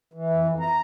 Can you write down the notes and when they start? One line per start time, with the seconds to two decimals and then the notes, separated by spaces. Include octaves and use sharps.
0.14 E3
0.30 F2
0.44 F2
0.60 A#5